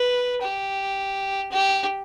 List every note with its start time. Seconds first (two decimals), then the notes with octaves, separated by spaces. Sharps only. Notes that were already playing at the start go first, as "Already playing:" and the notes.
Already playing: B4
0.42 G4
1.51 G4